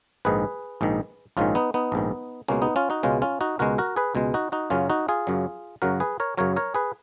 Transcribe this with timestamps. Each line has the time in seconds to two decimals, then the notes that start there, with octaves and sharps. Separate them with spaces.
0.25 A#1 G#2 D#3 G#4 B4
0.81 A#1 G#2 D#3
1.37 A#1 G#2 D#3 C#4 F4
1.55 B3 D#4
1.74 B3 D#4
1.92 A#1 G#2 D#3
2.48 C#2 B2 G#3 A#3 C#4
2.62 B3 D#4
2.76 C#4 F4
2.90 D#4 F#4
3.03 C#2 B2 G#3 C#4 F4
3.22 C#4 F4
3.41 D#4 F#4
3.59 C#2 B2 G#3 F#4 A#4
3.78 F#4 A#4
3.96 G#4 B4
4.15 C#2 B2 G#3
4.34 D#4 F#4
4.52 D#4 F#4
4.70 F#2 C#3 F#3 C#4 F4
4.90 D#4 F#4
5.08 F4 G#4
5.27 F#2 C#3 F#3
5.82 F#2 C#3 F#3 F#4 A#4
6.00 G#4 B4
6.20 A#4 C#5
6.37 F#2 C#3 F#3 A#4 C#5
6.56 A#4 C#5
6.74 G#4 B4